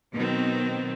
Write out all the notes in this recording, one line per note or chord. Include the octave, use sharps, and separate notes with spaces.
B2 D#3 F#3 B3 C4